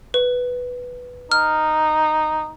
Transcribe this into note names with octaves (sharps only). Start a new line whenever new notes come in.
B4
D#4 F6